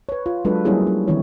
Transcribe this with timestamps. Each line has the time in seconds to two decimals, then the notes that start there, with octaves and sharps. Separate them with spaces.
0.09 B4 C#5
0.26 F4
0.45 F#3 G#3 D4 F4 A4 B4
0.65 F#3 G3 A#3 C#4 E4 G#4
0.87 C#4
1.08 D#3 E3 C4 E4 C#5